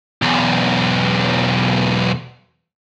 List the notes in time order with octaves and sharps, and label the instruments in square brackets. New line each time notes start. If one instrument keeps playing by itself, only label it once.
[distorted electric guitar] B1 E2